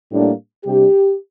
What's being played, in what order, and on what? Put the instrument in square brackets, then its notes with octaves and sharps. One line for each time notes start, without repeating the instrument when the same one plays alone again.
[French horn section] A2 G3 A#3 D4
C3 G3 D4 G4